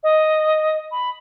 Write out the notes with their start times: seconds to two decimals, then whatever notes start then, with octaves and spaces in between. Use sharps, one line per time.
0.03 D#5
0.91 B5